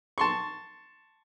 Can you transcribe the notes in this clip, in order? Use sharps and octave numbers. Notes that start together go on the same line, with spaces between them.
A5 C6 C#6